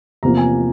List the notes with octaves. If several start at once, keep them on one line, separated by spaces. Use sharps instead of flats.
E2 C3 F3 A#3 A#5
G#5